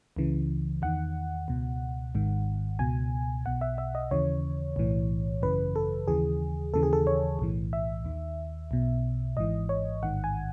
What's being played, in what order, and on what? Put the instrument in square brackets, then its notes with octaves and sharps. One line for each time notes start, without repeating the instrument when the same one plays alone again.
[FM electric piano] C#2 C#3 E3
E2 D#3 F#5
C#2 B2
G#1 G#2 D#3
C#2 B2 G#5
B1 B2 F#5
E5
E5
D#5
D#2 C#3 E3 C#5
B1 A2 E3
G#1 F#2 C#3 E3 B4
A4
D#2 C#3 E3 G#4
D#2 C#3 E3 A4
G#4
A4
C#5
B1 A2 E3
E5
D#2 D#3
B1 B2
G#1 G#2 E3 D#5
C#5
A1 G#2 D#3 F#5
G#5